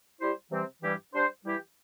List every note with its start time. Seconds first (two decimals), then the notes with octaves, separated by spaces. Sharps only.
0.19 G3 E4 G4 C5
0.51 C3 E3 G3 C4
0.82 G2 E3 G3 E4 G4
1.13 G3 D4 C5
1.45 E3 G3 E4 G4